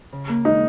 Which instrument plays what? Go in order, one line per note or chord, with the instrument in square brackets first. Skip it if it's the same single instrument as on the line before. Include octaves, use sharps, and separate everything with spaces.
[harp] C#3
A#3
[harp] G#3 [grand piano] D#4